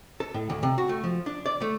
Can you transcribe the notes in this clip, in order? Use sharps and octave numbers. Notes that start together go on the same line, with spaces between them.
A4
A2
D2
C3
F#4
A3
F3
D4
D5
A3